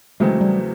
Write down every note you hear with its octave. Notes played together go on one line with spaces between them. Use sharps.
E2 C#3 F#3 G#3 A3 C4
G3